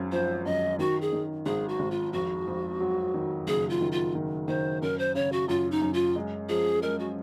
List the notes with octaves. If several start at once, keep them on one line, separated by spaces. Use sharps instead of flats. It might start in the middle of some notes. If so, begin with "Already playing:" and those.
Already playing: G#1 F#2
F3 C5
F#2 D#5
D#3 F#4
G#4
D#3
G#1 G#4
F#4
G#1
F4
F2 F#4
F2
F#3
D#3
F#1 G#4
F4
D#3
F4
D#3
D#3 C5
F#2 A#4
C5
C#3 C#5
F#4
F#2 F4
D#4
F#2
F4
G#3
F3 G#4
G#3 A#4
F#4